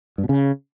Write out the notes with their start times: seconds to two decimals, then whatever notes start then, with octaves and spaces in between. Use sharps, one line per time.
0.18 G2
0.24 B2
0.29 C#3